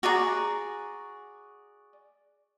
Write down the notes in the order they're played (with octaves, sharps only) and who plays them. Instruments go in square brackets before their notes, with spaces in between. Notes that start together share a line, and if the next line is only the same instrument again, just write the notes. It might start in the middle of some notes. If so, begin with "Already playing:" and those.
[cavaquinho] F#4 G#4 D5 A#5